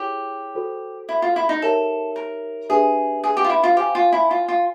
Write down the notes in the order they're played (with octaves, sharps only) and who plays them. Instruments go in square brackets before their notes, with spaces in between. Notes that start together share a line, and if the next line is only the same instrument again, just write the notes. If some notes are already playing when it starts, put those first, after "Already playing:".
Already playing: [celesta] E4 G#4 C#5 [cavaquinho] G4
[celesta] F#4 A4 C5
[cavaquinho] E4
F4
E4
D#4
[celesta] D#4 G4 A#4 C#5 E5 [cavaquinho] A4
[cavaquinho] A#4
[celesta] D4 G4 B4 E5 [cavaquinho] G#4
[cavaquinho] G#4
G4
F4
E4
F4
[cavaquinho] G4 [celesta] C5 F5 G#5
[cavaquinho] F4
E4
F4
F4